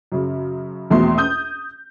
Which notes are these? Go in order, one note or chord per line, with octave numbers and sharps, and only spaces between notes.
F#2 C#3
A#1 E2 B2 A3 C6
D#6 G6